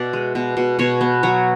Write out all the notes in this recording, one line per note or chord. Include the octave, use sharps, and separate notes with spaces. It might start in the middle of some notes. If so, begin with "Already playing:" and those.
Already playing: B2 D5 E5
G#3
B2
B2
B2 C#5
B3
F#3 C#5